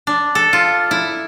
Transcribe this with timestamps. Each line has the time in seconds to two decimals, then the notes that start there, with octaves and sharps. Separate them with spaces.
0.07 D4
0.35 A4
0.53 F4
0.91 E4